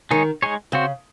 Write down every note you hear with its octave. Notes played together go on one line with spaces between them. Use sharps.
D#3 G#3 D#4 G#4 C#5
G#3 D#4 G#4 C#5
C#3 C4 F#4 C5